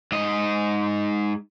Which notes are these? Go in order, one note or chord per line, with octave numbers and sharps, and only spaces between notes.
G#2 D#5